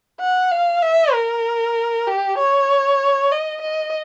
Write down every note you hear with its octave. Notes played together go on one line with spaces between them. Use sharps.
F#5
F5
E5
A#4
G4
C#5
D#5
D#5